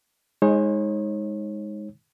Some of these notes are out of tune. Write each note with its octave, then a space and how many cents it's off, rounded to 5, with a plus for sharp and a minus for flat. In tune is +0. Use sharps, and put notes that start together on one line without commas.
G#3 -5 D#4 +15 C#5 -35